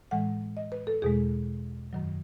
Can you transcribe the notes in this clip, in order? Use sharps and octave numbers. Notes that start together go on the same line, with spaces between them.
A2 E3 G#3 F#5
D#5
B4
A4
E2 B2 G#3 G#4
F#2 D#3 F#3